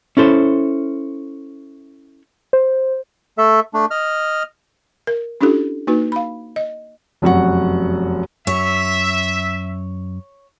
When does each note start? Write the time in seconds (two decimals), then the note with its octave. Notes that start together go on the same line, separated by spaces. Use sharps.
0.17 C#4 E4 A4 C5
2.53 C5
3.38 A3 A4 E5
3.74 A3 D4
3.91 D#5 F6
5.07 A#4
5.41 C#4 D4 E4 F4 G4 A4
5.87 A#3 D#4 F#4 B4
6.12 F5 B5
6.56 D#5
7.22 F1 F#2 F#4 F#5
8.47 F#2 C#5 E5